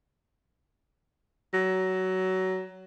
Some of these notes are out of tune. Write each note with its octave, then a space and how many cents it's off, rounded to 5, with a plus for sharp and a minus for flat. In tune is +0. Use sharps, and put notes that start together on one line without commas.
F#3 +20